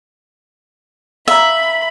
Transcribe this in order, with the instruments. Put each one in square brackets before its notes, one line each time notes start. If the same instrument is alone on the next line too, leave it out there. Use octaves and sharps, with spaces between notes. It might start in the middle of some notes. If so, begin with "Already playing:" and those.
[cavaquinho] E5 [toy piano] F5 A#5 [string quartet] B5